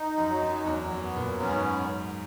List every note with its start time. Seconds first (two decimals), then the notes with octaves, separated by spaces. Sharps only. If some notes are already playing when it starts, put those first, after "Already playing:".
Already playing: D#4
0.18 F#2
0.30 F#3
0.42 F#2
0.66 E2 F#3
0.91 F#2
1.03 B3
1.16 A#2
1.40 F#2 C#4
1.49 G#2